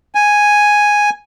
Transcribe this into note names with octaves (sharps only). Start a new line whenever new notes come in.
G#5